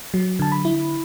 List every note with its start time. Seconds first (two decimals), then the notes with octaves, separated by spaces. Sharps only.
0.14 F#3
0.39 D3 A5
0.52 B5
0.65 E4